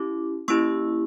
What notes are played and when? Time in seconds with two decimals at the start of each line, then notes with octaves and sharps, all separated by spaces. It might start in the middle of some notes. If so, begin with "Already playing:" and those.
Already playing: C#4 E4 G4 D6
0.48 A#3 C#4 E4 G4 C#6 E6